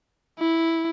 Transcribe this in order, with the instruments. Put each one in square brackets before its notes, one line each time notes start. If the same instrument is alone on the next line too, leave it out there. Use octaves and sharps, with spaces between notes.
[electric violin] E4